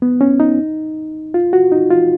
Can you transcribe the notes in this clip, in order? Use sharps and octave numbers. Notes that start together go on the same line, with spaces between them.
B3
C#4
D#4
F4
F#4
D#4
F4